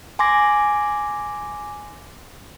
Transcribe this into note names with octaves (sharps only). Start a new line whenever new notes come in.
G#5 C6 D6 A#6